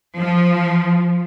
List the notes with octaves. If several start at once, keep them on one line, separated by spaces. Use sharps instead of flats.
F3